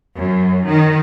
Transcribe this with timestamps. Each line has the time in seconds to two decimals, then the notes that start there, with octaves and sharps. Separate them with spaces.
0.17 F#2
0.68 D#3